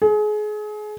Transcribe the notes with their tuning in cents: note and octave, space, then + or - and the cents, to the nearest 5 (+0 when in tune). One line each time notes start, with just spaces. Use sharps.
G#4 +30